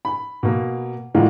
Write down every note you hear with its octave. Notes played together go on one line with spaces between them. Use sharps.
B5
B2 A#3
A2 D3 E3 G#3 A#3 F4